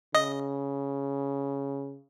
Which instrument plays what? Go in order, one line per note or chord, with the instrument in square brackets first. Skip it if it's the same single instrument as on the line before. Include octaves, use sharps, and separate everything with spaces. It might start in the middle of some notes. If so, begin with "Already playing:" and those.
[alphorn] C#3 [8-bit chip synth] D#5